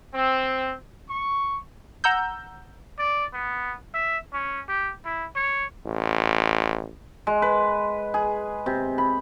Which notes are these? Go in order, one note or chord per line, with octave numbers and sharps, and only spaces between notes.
C4
C#6
F#5 A#5 E6 G6
D5
B3
E5
C#4
G4
E4
C#5
A1
G#3
B4
G#4
C3
B5